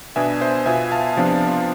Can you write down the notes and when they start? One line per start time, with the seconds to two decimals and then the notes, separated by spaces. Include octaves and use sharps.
0.16 B2 B3 D4 E5 G#5
0.41 C5 E5
0.66 B2 B3 F4 E5 G#5
0.91 F5 A5
1.17 C3 F3 B3 D4 F4